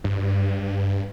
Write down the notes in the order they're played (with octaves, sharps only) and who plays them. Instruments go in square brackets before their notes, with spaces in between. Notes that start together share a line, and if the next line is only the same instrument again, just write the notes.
[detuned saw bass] G2